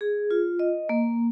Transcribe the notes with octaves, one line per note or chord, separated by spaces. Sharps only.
G#4
F4
D#5
A#3